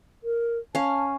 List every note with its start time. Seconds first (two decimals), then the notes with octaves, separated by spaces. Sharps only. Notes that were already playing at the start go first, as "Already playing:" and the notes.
0.24 A#4
0.75 C#4 F5 A5